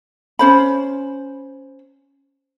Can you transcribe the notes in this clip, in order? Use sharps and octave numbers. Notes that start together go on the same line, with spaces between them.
C#4 C5 B5